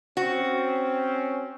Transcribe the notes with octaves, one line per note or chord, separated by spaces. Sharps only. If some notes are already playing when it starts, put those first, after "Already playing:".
C4 C#4 F#4